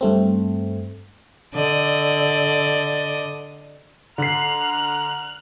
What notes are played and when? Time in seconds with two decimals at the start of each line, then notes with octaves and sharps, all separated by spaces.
0.01 G2 A3 C4
1.54 D3 D5 D#5
4.18 D3 A#5 F6 F#6 C7